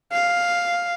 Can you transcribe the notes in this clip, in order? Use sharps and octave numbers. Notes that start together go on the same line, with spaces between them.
F5